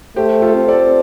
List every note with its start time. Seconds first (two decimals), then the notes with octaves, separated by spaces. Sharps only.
0.16 A3 G4 C5
0.42 F4 A4
0.55 C4
0.68 A4 D5